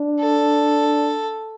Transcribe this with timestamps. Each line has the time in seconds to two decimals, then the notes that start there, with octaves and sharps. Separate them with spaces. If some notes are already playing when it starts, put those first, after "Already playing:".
Already playing: D4
0.20 A4